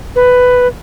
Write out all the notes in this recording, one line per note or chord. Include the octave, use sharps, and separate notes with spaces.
B4